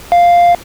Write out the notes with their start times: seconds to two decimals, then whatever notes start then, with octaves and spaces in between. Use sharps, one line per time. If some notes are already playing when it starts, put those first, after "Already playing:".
0.12 F5